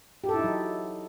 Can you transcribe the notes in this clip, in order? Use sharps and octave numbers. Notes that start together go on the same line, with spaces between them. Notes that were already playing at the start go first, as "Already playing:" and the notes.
G4
A4
E4
D#4
F#3